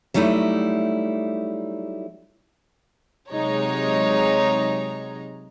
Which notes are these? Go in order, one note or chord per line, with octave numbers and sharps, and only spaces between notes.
F#3 G3 A3 D#4 E4
C3 F#3 G#3 D#4 C#5 A#5